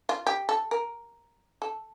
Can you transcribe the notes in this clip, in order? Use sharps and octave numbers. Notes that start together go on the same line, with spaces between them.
F4
G4
A4
A#4
A4